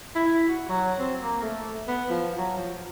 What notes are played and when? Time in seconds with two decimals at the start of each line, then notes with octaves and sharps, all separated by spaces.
0.15 E4
0.48 F#4
0.69 F#3
0.99 C4
1.22 A#3
1.42 A3
1.88 B3
2.10 F3
2.38 F#3
2.57 F3